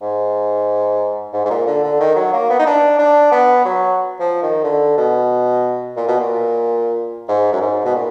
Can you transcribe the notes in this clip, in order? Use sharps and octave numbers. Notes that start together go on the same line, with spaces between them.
G#2
G#2
G#2
A#2
D3
D3
D#3
F#3
A#3
B3
D#4
D4
D4
B3
F#3
F3
D#3
D3
B2
A#2
B2
A#2
G#2
F#2
G#2
B2
A#2